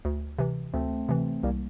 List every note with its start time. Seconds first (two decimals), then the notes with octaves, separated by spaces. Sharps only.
0.05 D2
0.39 C3 E3
0.74 D2 A3 C4
1.09 C3 E3
1.43 C2 G3 A#3